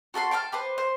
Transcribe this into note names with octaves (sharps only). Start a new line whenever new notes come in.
F#4 A4 B5 C6
G5 A5 B5 F6
G4 B4 C5
C5